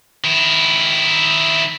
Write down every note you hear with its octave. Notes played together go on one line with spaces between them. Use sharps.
D#3 E4